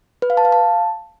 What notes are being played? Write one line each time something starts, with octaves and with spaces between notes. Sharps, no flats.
B4
F5
A5
F5
A5